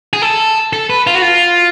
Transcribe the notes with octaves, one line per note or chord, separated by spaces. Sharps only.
G#4
A4
A4
B4
F4
F#4
F4